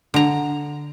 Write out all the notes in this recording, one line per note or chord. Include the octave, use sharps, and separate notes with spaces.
D3 A#5